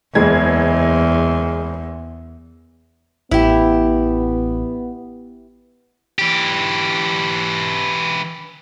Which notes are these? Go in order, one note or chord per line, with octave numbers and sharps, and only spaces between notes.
F#1 E2 G#3 G#6
A1 B3 E4 G4
E3 G4